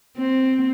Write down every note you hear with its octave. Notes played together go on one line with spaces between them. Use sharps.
C4